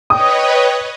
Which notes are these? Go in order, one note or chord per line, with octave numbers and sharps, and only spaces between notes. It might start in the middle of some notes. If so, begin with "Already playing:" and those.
B4 C#5 D#5 G5 D#6